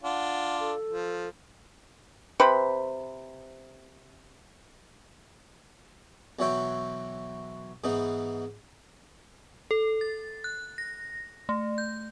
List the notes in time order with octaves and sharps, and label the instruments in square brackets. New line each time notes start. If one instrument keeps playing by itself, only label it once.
[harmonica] D4 F4 [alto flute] F#5
[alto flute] A4
[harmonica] F3
[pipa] C3 B4 C5 B5
[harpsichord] B1 E3 F#3 C#5 E5 G5
G#2 E3 B3 D#4
[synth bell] A4
A6
F#6
A#6
A3
G6